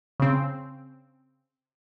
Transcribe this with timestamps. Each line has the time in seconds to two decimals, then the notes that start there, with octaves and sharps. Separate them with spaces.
0.20 C#3 C4